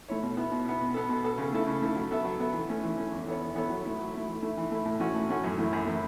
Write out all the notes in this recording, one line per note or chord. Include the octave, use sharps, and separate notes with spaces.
A3 E4 C#5
B2
B3 E4
B2
B3 E4
B2
B3 A4
B2
B3 A4
C#3
A3 E4 A4
C#3
A3 E4 A4
F#3
B3 A4 E5
F#3
B3 A4 E5
E3
A3 C#4
E3
A3 C#4
E2
E3 B3 A4 C#5
E2
E3 B3 A4 C#5
F#3
A3 E4
F#3
A3 E4
E3
A3 E4
E3
A3 E4
A2
E3 A3 C#4 F#4
A2
E3 A3 C#4 F#4
F#2
E3 A3 E4
F#2
E3 A3 E4